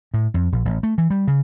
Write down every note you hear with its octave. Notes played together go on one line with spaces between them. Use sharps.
A2
F2
A#1
A1
A3
E3
G3
C#3